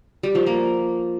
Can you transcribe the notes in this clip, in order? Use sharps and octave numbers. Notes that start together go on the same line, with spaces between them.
G3
F3
A#3